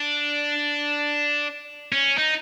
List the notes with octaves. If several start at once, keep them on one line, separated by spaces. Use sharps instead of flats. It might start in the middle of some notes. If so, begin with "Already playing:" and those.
Already playing: D4
C#4
D#4